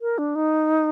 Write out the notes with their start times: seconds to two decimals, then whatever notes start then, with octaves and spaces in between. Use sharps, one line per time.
0.01 A#4
0.18 D4
0.35 D#4